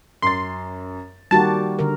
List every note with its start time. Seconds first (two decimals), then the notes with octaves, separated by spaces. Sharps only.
0.22 F#2 C6 A6
1.31 D#3 G3 A#3 F#4 G4 A5
1.79 D3 A#4